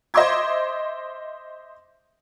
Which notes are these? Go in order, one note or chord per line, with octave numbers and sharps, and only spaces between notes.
C5 D#5 E5 C6 D6 G#6